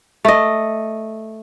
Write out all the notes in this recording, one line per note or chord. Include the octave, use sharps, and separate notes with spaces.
A3 D#5